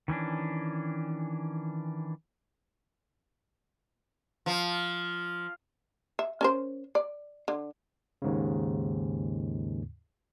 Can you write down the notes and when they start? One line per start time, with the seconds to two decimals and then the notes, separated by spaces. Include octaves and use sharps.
0.08 D#3 E3 C#4 D4
4.46 F3
6.19 E5
6.41 C#4 A#4 C5
6.95 D5
7.48 D3
8.22 D#2 G#2 C#3